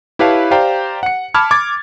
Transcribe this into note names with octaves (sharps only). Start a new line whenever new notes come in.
E4 G4 B4 C#5 F5 A5
G4 C5 D5 F5 G5 A#5
F#5 C#7
A5 B5 D6 F6 G#6
D6 G#6 A6